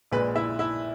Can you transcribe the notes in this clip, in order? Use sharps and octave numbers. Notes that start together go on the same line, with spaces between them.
A#1 A#2 G#3 B4 B5
E4 E5
E4 E5